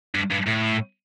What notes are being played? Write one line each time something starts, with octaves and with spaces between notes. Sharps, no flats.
G2
G2
A2